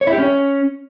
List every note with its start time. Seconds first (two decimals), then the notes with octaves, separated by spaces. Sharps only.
0.01 C#5
0.07 E4
0.13 G4
0.18 C#4